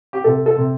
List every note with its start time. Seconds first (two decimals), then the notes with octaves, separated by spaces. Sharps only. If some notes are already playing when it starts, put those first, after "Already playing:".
0.13 G4
0.24 C3 A4
0.46 A4
0.57 C3